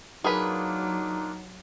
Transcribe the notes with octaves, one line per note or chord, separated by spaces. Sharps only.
F#3 A#3 D4 D#4 F4 G#4 A#4 B4